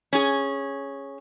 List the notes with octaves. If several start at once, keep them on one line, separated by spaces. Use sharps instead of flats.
C#4 G#4